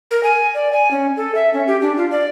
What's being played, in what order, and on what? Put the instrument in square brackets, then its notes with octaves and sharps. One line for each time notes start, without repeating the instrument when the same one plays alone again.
[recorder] A#4
G#5
D5
G#5
C#4
A4
E5
C#4
G4
D4
F4
D5